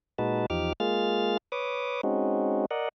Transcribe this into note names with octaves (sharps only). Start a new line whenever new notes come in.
A#2 G#3 D#4 F#4 B4 A5
E2 F3 D#4 G4 D6 F6
G#3 A#3 F4 G#4 F6 A6
B4 C#5 D6 D#6
G#3 C4 C#4 D#4 F#4
A#4 D5 D#5 F#5